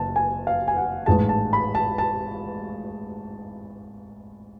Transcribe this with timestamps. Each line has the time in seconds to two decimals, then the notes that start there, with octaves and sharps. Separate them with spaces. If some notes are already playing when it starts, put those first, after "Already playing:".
Already playing: F#1 A5
0.16 G#5
0.47 F5
0.68 G#5
0.77 F#5
1.06 A1 G#2 G#3 A5
1.29 A5
1.53 B5
1.75 A5
1.98 A5